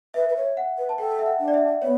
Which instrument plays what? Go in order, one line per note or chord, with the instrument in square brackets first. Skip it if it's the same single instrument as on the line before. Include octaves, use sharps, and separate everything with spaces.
[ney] B4 [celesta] E5
[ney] B4
C#5
[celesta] F#5
[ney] B4
[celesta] A5
[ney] A4 [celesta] G5
[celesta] E5
F#5
[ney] D4
[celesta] D5
E5
[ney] B3 [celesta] C#5